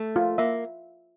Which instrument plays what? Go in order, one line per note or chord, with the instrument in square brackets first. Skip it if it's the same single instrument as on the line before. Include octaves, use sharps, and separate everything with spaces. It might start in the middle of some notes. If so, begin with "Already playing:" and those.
Already playing: [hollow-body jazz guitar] A3
[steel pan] F4
[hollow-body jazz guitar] A#3 [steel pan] E5